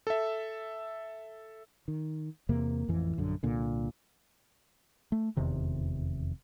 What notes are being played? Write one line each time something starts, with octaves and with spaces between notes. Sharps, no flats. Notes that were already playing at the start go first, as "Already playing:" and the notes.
A4 E5
D#3
E2 C3 A#3
A1 F2 E3
A#1 F#2 D3
C2 A#2 D3
A3
F1 E2 C3 D#3